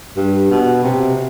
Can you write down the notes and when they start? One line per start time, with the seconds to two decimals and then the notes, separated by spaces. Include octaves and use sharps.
0.16 G2
0.50 B2
0.84 C3